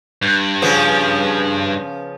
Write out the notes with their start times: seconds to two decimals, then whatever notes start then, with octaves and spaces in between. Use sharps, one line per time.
0.22 G2
0.62 C#3 F3 B3